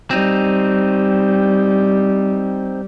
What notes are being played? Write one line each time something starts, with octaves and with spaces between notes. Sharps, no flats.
G3 C4 D#4